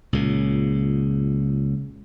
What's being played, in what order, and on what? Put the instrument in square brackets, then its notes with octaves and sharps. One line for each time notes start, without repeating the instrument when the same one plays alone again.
[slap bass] C#2 A#2 C#3